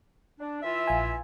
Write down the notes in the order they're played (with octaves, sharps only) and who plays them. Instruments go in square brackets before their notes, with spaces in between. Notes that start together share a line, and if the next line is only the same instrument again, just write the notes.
[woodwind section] D4
E3 F4 E5
[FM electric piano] A#1 F5 G#5